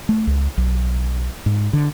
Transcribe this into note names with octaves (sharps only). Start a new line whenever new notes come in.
A3
C#2
B1
G#2
D3